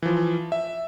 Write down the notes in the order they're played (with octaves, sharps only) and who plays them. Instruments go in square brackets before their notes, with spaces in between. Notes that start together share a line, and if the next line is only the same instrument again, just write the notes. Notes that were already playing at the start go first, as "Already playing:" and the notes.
[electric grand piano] E3 F3
E5